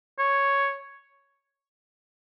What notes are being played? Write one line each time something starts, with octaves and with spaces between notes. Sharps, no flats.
C#5